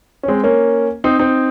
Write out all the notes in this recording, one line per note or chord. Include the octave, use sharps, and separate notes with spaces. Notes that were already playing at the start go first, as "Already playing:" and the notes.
C#4
G#3 C4
A#3 C#4
C4 D#4
C4 D#4